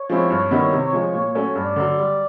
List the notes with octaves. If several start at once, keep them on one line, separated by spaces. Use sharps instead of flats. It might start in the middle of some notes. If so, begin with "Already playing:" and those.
Already playing: C#5
F3 G#3 C4 E4
G2
D#3 G3 B3 E4
C3
F3 G#3
A#2
F#3 A3 C#4
G2 D5
D3 F#3
G3